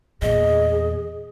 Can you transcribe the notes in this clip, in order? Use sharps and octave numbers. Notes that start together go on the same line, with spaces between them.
E2 A#2 G#4 D#5